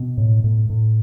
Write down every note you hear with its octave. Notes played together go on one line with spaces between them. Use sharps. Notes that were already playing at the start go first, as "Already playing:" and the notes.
Already playing: B2
A2
A2
A2